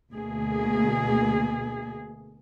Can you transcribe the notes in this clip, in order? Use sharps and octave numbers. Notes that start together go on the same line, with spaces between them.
D2 B2 A3 A#3 G#4